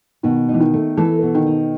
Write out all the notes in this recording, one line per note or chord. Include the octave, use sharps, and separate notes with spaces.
B2 D#3
D#4
E3
D#3
A3
E3 A4
B2
D#3
D#4